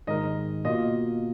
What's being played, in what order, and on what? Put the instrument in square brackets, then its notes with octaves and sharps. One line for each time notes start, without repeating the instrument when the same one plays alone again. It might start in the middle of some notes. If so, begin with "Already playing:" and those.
[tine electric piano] G#2 D#3 G#3 D#4 A#4 [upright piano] D#5
[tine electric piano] B2 A#3 F4 [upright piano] D#5